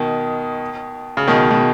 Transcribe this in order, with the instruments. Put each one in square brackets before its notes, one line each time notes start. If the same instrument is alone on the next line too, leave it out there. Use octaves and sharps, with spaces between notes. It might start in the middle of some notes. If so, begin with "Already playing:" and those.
Already playing: [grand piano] B2 D#3
C#3
B2 D#3
B2